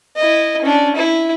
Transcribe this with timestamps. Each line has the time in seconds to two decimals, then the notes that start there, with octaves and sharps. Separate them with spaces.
0.16 E4 D#5
0.62 C#4 D4
0.96 E4